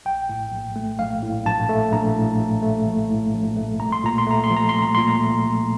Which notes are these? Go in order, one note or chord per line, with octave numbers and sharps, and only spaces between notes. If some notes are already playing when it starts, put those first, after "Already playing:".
A#1 G5
A2
A#1
A3
A#1 F5
A2
A#1 A5
A3
A#1 A#5
A2
A#1
A3
A#1
A2
A#1
A3
C2 A#5
C6
A#2 A#5
C6
A3 A#5
C6
F3
A#5
C2 C6
A#5
A#2 C6
A#5
A3
F3